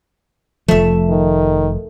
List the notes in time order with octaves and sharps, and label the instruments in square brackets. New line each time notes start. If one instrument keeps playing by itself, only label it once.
[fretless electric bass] F1 F3 [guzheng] A3 E5
[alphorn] D#3